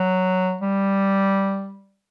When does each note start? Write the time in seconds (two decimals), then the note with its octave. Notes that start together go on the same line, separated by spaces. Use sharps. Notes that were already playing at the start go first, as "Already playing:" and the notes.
Already playing: F#3
0.61 G3